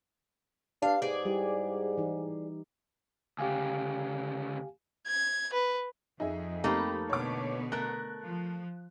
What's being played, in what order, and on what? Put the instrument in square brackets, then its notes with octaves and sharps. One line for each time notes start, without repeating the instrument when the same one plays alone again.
[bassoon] D4 [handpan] G4 B4 [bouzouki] F5
[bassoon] G#2 [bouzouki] G#4 D5
[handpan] G3 E4 G4
E3 D#4
[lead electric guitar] D2 C#3 [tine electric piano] G4 F5 G#5
[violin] G#6
B4
[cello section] F2 [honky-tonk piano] D#4 G#4 E5
[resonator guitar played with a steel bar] A3 A#3 D#4 [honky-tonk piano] C4 G4 B5
[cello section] B2 D3 B3 [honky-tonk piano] C#5 D6
[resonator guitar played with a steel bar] A3 A#4 [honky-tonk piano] F#6
[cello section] F3